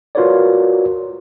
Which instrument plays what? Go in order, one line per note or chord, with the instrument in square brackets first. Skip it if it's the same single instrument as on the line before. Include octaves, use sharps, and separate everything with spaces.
[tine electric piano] F4 F#4 A#4 B4 C#5 D5